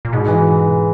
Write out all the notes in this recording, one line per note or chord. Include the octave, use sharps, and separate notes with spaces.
A#2
G#2 B2
E3